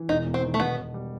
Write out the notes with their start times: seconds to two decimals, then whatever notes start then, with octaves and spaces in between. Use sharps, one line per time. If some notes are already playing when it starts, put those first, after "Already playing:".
Already playing: E3
0.09 E1 D#4
0.25 E1
0.34 C4
0.43 D#3
0.54 A3
0.60 B2 B3
0.77 B2
0.94 G3